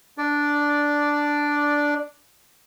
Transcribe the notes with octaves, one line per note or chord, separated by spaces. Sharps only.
D4 D5